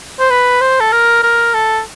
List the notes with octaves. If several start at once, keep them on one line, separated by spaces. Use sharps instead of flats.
C5
B4
C5
A4
A#4
A#4
A4